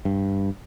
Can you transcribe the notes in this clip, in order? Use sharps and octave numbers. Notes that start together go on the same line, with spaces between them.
G2